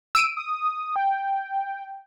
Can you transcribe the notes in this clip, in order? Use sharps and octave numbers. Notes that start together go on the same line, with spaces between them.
E6 D7 D#7
D#6
G5